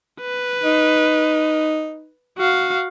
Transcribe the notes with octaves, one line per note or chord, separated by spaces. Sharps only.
B4
D#4
F#4 F5